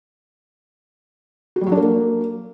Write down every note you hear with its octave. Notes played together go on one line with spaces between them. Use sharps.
F#4
G3
F#3
D4
A#3